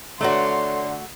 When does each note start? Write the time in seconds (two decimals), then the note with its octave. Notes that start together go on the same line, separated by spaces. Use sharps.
0.21 D3 A3 F#4 C#5 D5 A#5 C6